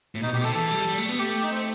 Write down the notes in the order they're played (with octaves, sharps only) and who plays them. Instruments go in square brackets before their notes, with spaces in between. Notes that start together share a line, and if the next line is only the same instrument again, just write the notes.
[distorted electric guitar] A2
[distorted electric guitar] B2 [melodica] D#4
[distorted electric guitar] B2 [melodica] G4
[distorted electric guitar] C3 [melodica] A4
[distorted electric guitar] E3 [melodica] A4
[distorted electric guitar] G3
G3
A3
B3
[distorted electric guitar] A3 [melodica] G4
[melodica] D#4
C4